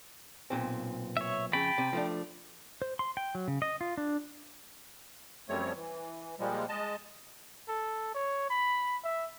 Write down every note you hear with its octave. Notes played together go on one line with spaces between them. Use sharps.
B1 A#2 C4
C#5 E5
F2 C#3 G5 A5 B5
C3
F3 A3 D4
C5
C6
G5
F#3
C#3
D#5
F4
D4
F#2 F3 G3 A3 C4 C#5
E3
A#2 F3 G3 G#3
G#3 D#5 A5
A4
C#5
B5
E5